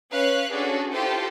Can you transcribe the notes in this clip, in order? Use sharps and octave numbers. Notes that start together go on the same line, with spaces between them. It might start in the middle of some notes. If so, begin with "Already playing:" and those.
C#4 B4 C#5 F5 F#6
C#4 D4 F#4 G#4 A4
E4 F4 G4 A4 C5